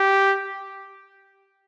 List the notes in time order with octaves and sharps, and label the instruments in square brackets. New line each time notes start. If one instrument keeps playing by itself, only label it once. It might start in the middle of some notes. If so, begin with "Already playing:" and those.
Already playing: [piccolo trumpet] G4